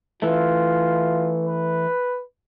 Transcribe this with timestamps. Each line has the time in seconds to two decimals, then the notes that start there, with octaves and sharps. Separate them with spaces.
0.22 E3 A3 F4
1.45 B4